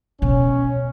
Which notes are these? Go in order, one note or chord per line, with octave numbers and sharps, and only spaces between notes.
B2 C#4